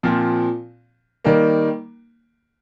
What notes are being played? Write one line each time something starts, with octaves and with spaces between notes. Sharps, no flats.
A#2 F3 C4
D#3 G3 A#3